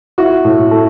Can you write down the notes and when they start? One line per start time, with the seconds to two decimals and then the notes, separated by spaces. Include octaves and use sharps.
0.18 E4 F#4
0.44 A2
0.71 A3